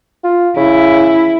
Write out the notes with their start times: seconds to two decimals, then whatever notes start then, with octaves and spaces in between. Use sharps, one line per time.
0.24 F4
0.57 C#3 E4